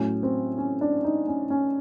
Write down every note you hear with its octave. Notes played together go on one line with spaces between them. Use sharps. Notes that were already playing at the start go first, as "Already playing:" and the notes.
Already playing: A2 F#3 C#4
C4
C#4
D4
D#4
C#4
C#4